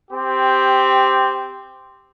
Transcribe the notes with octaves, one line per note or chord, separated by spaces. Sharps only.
C4 G4